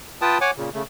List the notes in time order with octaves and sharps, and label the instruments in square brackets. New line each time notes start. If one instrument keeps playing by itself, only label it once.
[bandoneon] F4 B4 G5 A5 D#6
C#5 F#5 G#5 D6
A#2 C#3
C#3 A3